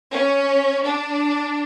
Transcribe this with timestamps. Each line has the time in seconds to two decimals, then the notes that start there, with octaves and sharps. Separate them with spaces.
0.12 C#4
0.84 D4